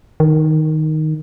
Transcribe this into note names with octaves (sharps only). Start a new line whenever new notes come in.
D#3